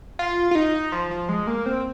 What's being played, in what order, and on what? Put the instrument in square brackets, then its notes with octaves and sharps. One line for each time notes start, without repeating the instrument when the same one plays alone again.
[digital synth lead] F4
F4
D#4
F3
F3
G#3
A#3
C4